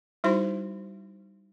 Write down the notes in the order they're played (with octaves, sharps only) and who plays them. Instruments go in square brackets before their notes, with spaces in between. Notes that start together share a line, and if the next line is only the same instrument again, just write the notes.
[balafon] G3 D#4 E4 F#4 C5 C6